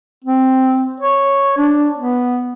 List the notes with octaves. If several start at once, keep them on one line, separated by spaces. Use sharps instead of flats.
C4
C#5
D4
B3